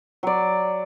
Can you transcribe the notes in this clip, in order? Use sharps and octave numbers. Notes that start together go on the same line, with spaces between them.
F#3 D5